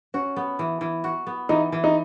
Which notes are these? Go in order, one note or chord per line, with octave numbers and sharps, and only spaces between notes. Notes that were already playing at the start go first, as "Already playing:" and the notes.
C#4 F#4
B3
E3
E3
F#4
B3
E3 D#4
E3
D#4